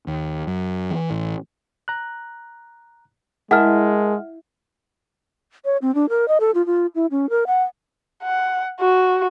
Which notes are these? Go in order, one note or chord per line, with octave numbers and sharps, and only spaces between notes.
D#2
F#2
E3
A1
A#5 F#6
G#3 E4 G#4 A#4 F#5 A5 F6
C#5
C4
D4
A#4
D#5
A4
F4
F4
E4
C#4
A#4
F#5
F#5
F#4